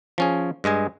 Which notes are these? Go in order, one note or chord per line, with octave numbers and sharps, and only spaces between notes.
F3 C#4 G#4
G2 G#3 D#5 G#5